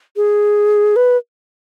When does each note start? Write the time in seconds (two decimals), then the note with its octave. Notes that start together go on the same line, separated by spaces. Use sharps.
0.16 G#4
0.96 B4